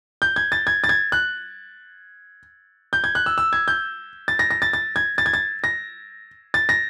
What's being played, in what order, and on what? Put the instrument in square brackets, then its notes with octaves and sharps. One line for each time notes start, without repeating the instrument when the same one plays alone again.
[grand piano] G6
G#6
A6
G#6
A6
G#6
F#6
G6
G#6
F#6
E6
E6
G#6
G6
A6
A#6
A#6
A6
A6
G#6
A6
G#6
A6
A#6
A6
A#6